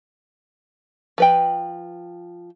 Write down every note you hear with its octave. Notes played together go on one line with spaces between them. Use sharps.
F3 B4 G5